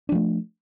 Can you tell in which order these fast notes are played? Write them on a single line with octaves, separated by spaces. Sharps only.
D4 F3 A3